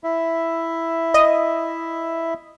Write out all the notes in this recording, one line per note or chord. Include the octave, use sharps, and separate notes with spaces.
E4 E5
D#5